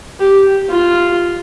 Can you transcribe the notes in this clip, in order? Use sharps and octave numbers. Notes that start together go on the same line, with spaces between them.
G4
F4